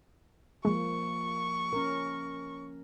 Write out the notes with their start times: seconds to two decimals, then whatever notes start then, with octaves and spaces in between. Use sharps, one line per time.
0.65 F3 G#3 A#3 C#6
1.73 C#4 A#4